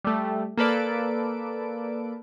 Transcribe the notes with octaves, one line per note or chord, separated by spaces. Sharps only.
G3 A3
A#3 A4 B4 D5 D7